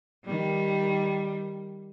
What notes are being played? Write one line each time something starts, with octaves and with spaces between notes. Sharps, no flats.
D#3 G3